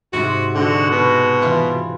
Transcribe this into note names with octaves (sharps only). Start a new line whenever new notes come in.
G#2 C3 F#4
D3 G#3 F#4
B2
E3 F4 C6